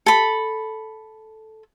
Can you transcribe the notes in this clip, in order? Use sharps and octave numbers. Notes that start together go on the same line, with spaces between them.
A4 B5